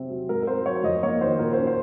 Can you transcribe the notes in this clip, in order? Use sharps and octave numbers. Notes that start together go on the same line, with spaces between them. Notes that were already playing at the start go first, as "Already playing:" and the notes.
Already playing: C3 F#3 C4
F#3
G#2 A#4
A#4
C4 C5
F#3 C#5
F2 D#5
A#3 C#5
D#3 C5
A#2 A#4
C#4 C5
C5